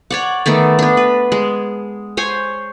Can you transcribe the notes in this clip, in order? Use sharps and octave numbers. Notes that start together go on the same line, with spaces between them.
C#5 D5 F#5
D#3 A3 B3 D5
B3 D4
B4
G#3
C5 C#5 G#5